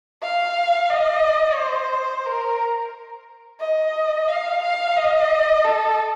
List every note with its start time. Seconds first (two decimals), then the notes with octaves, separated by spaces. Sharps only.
0.23 F5
0.90 D#5
1.58 C5
2.26 A#4
3.61 D#5
4.28 F5
4.63 F5
4.97 D#5
5.64 A4